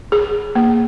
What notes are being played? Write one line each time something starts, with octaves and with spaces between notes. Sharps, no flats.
G#4
A#3